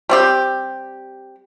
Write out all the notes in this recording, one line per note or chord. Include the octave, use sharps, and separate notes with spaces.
G3 C4 G4